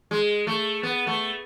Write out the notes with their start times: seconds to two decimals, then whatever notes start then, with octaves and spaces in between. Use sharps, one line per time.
0.11 G#3
0.47 A3
0.83 B3
1.07 A3